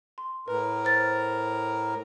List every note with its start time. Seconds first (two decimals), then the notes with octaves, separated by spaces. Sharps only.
0.18 C6
0.48 A2 A#4 B4
0.85 C5 F6 A6